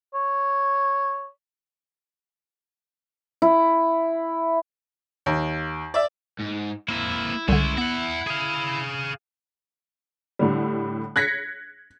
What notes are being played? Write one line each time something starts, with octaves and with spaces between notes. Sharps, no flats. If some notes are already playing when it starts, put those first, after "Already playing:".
C#5
E4
D#2
D5 E5
G#2
A#3 C4 E4
C2 D3 G#3 C#4 E4
B3 E5 F#5
G#4 F5
A2 D3 G3
F#6 G#6 A#6 B6 C#7